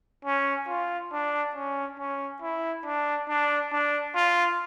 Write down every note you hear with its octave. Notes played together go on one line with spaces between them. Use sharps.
C#4
F4
D4
C#4
C#4
E4
D4
D4
D4
F4